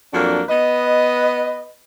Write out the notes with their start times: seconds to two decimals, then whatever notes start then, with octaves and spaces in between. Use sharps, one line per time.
0.13 F2 F#3 A#3 D4
0.49 B3 B4 D#5